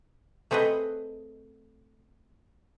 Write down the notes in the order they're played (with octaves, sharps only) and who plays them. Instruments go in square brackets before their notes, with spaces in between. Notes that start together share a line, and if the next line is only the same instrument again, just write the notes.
[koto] A3 C4 G#4 B4 D#5